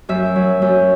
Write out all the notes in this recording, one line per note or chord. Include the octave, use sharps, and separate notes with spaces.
F#2 E5
F#3
F#2